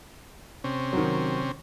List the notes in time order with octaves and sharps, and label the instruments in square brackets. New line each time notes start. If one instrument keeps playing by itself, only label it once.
[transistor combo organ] C3 C4 C#4
[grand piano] D#3 F#3